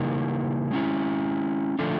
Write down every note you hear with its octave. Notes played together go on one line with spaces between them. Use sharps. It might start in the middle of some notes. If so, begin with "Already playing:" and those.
Already playing: C#3 E3 G3 A#3 D#4
G#3 C#4 E4
D3 F3 A3 D4 F4